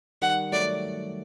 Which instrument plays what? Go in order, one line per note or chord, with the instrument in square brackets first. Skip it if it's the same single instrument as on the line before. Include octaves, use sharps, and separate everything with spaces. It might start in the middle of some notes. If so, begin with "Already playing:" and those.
[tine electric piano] D#3 G3 [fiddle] F#5
[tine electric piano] F#3 A3 [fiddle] D5